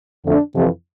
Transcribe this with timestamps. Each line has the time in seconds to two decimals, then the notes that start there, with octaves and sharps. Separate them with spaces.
0.24 F2 D3 A3 D4
0.55 F2 C3 E3